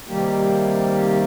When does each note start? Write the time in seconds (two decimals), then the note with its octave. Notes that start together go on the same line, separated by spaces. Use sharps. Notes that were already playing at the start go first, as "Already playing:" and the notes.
0.08 C3 D#3 G3 A#3 G4